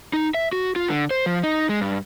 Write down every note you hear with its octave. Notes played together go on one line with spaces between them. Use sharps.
D#4
E5
F#4
F4
D3
C5
F3
D#4
G#3
G2